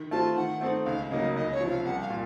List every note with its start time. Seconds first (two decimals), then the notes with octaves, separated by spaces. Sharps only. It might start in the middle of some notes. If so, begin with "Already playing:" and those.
Already playing: D#3
0.11 A3 C4 F4 A5
0.36 D#3 F#5
0.61 A3 C4 D#4 A4
0.85 C#2 F5
1.11 C#3 F#3 A#3 D#4 D#5
1.36 C#2 D#5
1.52 C#5
1.61 C3 F3
1.69 F5
1.85 C2 F#5
2.02 F5
2.10 A#2